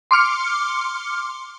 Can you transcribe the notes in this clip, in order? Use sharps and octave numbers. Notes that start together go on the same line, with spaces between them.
C6 D6 F6 C#7